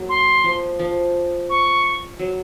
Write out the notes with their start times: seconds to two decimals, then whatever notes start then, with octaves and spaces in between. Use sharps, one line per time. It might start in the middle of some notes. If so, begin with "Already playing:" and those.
Already playing: F#3 A#3
0.09 C6
0.44 F3
0.79 F3
1.49 C#6
2.19 F#3